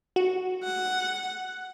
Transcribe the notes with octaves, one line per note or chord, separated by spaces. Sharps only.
F#4
F#5